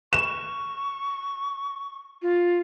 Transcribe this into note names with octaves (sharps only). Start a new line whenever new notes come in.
C#6 E7
F4